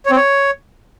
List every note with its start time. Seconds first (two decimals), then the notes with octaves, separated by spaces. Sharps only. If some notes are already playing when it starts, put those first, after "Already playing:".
0.06 C#5
0.11 C4
0.16 C#5